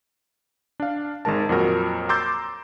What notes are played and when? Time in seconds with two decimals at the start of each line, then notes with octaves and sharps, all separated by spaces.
0.80 D4 F5
1.25 G#1 D#3 G#3 A#4 A5
1.49 F2 A#2 F#3 F#4 A#4 D#6
2.09 A#5 C6 D6 E6 G6 A6